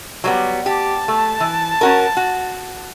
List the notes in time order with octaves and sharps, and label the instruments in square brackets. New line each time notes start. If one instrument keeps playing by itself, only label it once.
[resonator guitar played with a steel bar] F#3 G3 B3
[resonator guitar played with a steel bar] G4 [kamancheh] A5
[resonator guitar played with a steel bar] A3
E3
C#4 F#4 A#4
F#4